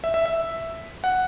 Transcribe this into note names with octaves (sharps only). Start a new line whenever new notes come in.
E5
E5
E5
F#5